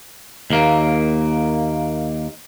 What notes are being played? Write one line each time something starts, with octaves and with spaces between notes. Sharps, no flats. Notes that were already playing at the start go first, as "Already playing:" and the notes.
D#2 A#3